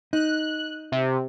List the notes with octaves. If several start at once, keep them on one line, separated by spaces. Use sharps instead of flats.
D#4 F#6
C3